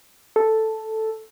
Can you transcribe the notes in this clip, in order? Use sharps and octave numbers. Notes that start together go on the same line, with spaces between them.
A4